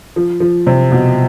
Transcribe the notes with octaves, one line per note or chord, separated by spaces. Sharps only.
F3
F3
C3
B2